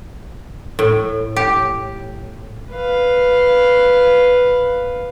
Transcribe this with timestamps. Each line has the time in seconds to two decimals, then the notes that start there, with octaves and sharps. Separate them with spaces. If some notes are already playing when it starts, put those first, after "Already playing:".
0.79 A2
1.36 G4
2.72 B4 F5